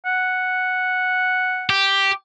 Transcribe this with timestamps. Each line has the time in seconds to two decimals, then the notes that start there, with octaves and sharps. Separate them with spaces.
0.05 F#5
1.70 G4